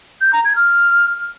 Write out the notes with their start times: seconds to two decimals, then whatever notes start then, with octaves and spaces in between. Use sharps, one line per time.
0.21 G6
0.33 A#5
0.45 G#6
0.56 F6